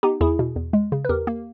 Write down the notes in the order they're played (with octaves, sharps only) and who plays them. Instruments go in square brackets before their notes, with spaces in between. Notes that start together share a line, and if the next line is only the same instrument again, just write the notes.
[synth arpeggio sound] B3 [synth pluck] D#4 G4
[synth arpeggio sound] E2 [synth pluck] E4 G#4
[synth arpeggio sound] B2
E2
G#3
C#3
[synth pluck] B4
[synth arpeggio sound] E2 [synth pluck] G4 A#4
[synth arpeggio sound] A#3